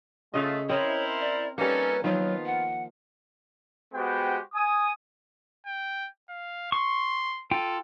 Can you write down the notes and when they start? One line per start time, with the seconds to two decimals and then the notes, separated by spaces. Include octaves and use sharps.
0.34 C#3 A3 F4 D#5
0.70 C4 E4 A#4 C5 C#5 D#5 E5
1.21 D5
1.58 G3 A#3 C#4 D#4 A4 B4
2.04 D#3 F3 F#3 B3 F4
2.46 F#5
3.94 G#3 B3 F#4 G4 C5 G5
4.54 G#5 D#6
5.66 G5
6.30 F5
6.72 C6 C#6
7.51 F4 A4 G5